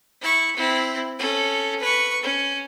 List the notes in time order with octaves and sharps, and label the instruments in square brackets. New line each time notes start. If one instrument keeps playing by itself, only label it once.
[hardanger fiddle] E4 C#6
C4 E4
C#4 A4
B4 C#6
C#4